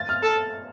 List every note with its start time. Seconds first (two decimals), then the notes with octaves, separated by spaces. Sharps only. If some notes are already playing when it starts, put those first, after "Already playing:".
Already playing: A6
0.09 F6
0.23 A4